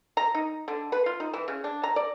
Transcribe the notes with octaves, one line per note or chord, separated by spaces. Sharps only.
A#5
D#4
D3
B4
F4
D#4
E3
C#3
D4
A#5
D5